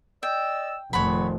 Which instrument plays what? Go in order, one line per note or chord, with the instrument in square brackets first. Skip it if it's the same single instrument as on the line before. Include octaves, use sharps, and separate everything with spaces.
[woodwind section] D5 D#5 E6 [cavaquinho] G5
[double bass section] F1 [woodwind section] A#2 D#3 F3 [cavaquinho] C#5 F#5 B5